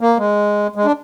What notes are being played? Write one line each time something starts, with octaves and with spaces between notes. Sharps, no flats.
A#3
G#3
G#3
D4